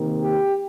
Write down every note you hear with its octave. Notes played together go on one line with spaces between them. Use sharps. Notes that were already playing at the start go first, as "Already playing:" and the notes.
Already playing: C3 D#3 A#3
G4